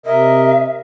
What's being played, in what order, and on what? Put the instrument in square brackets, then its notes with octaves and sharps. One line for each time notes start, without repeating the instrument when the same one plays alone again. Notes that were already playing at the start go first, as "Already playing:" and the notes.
[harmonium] C3 A#4 D#5 [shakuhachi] E5